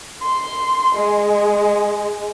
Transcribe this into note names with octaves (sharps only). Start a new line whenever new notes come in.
C6
G#3